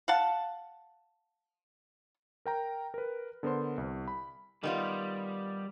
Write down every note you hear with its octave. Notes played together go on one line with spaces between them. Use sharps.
F5 F#5 A5
A#4 G5 A#5
A#4 B4
D3 B3 A#4 C5 C6
C2
B5
D#3 G3 B3 F4